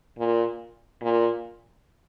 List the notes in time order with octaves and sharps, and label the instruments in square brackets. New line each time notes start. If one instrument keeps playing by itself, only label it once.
[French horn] A#2
A#2